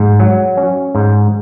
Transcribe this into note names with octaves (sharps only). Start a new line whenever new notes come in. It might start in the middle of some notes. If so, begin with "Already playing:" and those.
Already playing: G#2
F#3
C#4
G#2